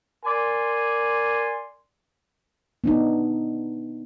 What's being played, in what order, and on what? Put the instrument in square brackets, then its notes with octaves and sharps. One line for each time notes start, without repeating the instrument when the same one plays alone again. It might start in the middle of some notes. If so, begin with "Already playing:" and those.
[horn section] A#4 D5 G#5 C6
[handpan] B3 D4 D#4